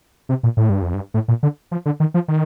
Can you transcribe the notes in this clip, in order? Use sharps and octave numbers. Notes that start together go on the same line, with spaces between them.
C3
A#2
A2
G2
F2
G2
A2
A#2
D3
F3
D3
D#3
F3
D#3